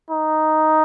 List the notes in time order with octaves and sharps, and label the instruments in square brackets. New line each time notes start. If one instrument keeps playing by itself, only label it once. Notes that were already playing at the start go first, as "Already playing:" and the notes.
[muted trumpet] D#4